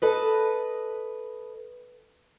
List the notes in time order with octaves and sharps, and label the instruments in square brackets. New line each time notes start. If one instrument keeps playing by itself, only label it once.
[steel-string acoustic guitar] A4 B4 D#5